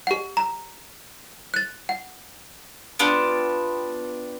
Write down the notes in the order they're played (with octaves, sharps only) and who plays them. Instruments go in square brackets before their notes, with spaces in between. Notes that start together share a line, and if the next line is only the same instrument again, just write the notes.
[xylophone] G4 F#5
A#5
F#6 A6
F#5
[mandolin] B3 D4 F4 G4